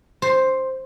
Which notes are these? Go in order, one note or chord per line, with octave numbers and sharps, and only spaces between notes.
C5